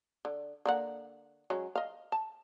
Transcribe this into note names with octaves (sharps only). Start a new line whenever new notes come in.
D3
D3 A#3 F#5
F#3 G#3 C#4
D#5 F5
A5